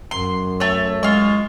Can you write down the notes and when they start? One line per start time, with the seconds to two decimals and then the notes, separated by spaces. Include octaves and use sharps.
0.11 F#2 C6
0.60 A3 C#5
1.03 G#3 F4 C#6